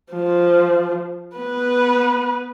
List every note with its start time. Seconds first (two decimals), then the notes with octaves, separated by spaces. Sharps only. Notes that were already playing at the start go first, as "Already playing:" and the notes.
0.13 F3
1.36 B3 B4